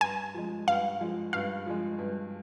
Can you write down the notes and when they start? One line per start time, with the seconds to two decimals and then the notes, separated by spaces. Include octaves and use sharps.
0.01 G2 G#5
0.34 F3 G#3
0.67 G2 F5
1.01 F3 G#3
1.33 G2 F5
1.66 F3 G#3
1.98 G2